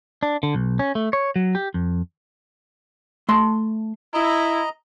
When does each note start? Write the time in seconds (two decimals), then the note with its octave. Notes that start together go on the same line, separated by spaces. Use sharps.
0.23 D4
0.43 D3
0.55 B1
0.79 C#4
0.95 A3
1.13 C#5
1.36 F#3
1.55 G4
1.74 F2
3.29 A3 A5 C6
4.14 E4 D#5 A#5